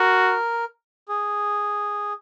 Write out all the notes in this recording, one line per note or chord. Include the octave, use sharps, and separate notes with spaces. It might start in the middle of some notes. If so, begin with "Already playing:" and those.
Already playing: F#4 A#4
G#4